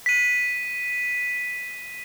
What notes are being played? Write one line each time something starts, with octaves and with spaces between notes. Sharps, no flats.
B6 D#7